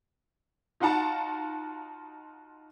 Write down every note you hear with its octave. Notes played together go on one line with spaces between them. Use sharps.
D#4 F4 F#4 F#5 A5 A#5